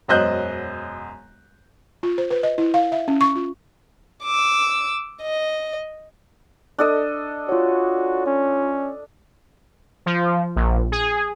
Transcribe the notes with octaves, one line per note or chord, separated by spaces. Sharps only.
E1 F#2 C5 D#5 F#6 G6
F4
C5
B4
D#5
E4
F5
E5
C#4
C#6
F4
D6 E6
D#5
D4 A4 D#5
F4 F#4 C#5
C#4
F3
A#1
G#4